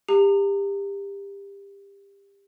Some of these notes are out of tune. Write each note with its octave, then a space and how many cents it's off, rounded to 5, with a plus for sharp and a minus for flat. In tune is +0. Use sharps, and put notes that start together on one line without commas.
G4 +25 A#5 -35